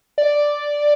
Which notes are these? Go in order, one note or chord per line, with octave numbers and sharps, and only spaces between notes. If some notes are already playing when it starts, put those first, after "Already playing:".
D5